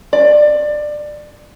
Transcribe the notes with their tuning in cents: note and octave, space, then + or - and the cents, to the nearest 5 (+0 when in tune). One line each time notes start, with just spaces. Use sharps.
D5 +20